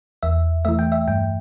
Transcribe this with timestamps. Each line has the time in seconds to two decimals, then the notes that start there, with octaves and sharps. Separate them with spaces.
0.23 E2 E5
0.65 E3 A3 E5
0.79 G5
0.92 E5
1.08 G2 G5